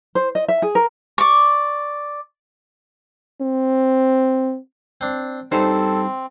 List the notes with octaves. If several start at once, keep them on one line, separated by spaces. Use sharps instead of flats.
C5
D#5
E5
G#4
A#4
D5 C#6
C4
C4 D4
G2 G3 C4 D#4 A4 C5